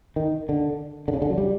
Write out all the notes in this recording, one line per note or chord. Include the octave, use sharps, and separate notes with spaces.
D#3
D3
D3
C#3
D3
F#3
G3